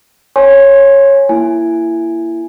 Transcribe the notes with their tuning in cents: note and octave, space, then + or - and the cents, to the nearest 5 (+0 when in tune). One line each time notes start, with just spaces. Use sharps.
C#5 -10 G#5 +0 C6 +20
A#3 -5 E4 +20 G#5 +0